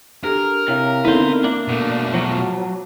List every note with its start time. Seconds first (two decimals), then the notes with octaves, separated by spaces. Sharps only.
0.24 D4 G4 A4 A#4
0.68 C3 E4 C#5 F5
1.05 D3 B3 C4 D#4 E4 B4 C5
1.44 A#3 D4 E5
1.68 B2 A3
2.14 F3 F#3 F#5 A5 D6